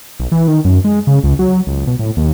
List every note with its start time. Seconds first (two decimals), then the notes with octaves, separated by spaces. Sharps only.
0.20 B1
0.32 E3
0.48 D#3
0.65 F#2
0.84 G#3
1.07 C#3
1.24 C#2
1.39 F#3
1.67 C#2
1.87 B2
1.99 A2
2.17 D#2